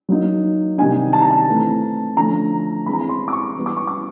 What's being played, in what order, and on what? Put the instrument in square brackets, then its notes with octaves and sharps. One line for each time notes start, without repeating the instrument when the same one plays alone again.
[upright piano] F#3 A#3 D#4
C3 D#3 G3 A#3 D#4 G#5
A5
A#5
A5
E3 A3 C4
D3 F3 A3 C#4 A#5
E3 G#3 C4 B5
A#5
B5
C6
D6
C#6
E3 G3 B3
D6
C#6
D6